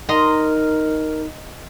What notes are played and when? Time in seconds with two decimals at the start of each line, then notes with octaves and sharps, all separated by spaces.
0.09 D#4 A#4 D#5 A#5 C6